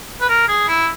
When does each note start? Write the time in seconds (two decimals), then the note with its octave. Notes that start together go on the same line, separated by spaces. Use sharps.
0.21 B4
0.29 A#4
0.48 G#4
0.68 E4